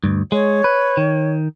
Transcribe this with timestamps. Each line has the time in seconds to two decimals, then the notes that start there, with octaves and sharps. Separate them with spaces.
0.04 D2 G2
0.32 G#3 C#5
0.64 B4
0.97 D#3